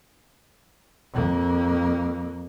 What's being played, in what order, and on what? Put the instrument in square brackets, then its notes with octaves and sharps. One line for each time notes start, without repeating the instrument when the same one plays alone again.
[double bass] F2 A#3